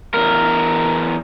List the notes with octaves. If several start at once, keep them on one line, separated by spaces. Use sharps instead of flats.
E2 A#4